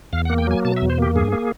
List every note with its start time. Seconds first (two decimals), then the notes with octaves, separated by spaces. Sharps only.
0.13 E2 F5
0.25 F#5
0.30 A#3
0.38 G5
0.47 F#3 G#5
0.65 B2 A5
0.77 E5
0.82 E2
0.90 C5
0.98 A#3 G4
1.16 G2 G#4
1.32 A#3